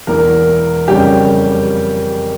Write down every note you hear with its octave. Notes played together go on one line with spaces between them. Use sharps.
E1 E2 E3 A#3 A#4
F2 C#3 G3 A#3 C#4 G4